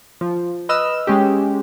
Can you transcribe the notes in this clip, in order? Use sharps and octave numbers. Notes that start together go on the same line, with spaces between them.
F3
B4 D#5 E6 F6
G#3 C#4 G4